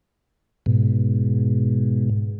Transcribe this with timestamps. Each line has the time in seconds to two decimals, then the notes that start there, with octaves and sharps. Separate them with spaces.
0.66 G#2 B2